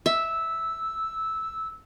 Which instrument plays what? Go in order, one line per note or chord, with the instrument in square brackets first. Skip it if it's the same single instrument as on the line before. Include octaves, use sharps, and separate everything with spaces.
[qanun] E5 [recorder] E6